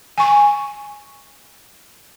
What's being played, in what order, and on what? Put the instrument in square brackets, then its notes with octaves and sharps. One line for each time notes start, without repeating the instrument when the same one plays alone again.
[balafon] G#5 C#6